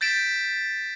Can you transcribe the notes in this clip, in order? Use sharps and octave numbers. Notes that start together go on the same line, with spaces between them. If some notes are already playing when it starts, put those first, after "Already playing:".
G6 A6 B6 D7 E7